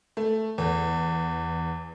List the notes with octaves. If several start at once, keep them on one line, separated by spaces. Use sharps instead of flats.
A3
E2